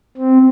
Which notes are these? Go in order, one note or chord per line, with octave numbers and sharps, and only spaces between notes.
C4